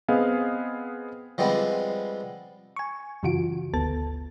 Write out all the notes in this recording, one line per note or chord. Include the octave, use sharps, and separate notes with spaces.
B3 C4 G#4 D#5 F5
F3 G3 G#3 B3 C4
G#5 C#6
F#2 C#3 E3 F4 F#4 D7
G1 D2 B3 A4 A5 A6